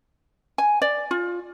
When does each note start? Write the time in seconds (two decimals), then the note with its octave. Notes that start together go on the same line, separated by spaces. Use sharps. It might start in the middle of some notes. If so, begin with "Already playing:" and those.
0.58 G#5
0.82 D5
1.11 F4